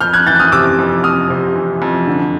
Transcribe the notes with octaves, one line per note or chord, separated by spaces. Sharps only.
F2 F6 G6
F#6 G#6
E3 G6 A6
F#6
D#6 F6
C3 D6 E6
F2
F2 D#6 F6
C3
E3
F2
D3